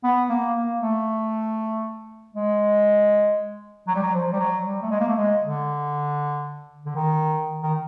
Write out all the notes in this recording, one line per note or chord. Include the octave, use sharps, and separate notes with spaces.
B3
A#3
A#3
A3
G#3
F#3
G3
F#3
F3
G3
F#3
G3
A3
G#3
A#3
A3
G#3
D3
D3
D#3
D#3